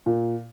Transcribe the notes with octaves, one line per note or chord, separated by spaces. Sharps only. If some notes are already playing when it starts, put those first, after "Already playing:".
A#2